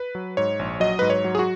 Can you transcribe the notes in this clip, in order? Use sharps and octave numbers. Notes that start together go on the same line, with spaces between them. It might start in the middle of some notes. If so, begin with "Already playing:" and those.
Already playing: B4
F#3
G#2 C#5
A#1
F#3 D#5
G#2 B4
C#5
F#3
G#4
F#4